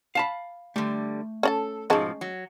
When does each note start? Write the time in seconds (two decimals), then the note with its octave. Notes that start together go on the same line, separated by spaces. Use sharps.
0.15 F5 A5 B5
0.76 D3 G3 A3
1.43 C#4 A4 D5 A5
1.90 G#2 B2 F3 G#3 C#4 A5
2.21 F#3